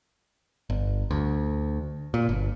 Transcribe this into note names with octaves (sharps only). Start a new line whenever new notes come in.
G1
D2
A#2
G1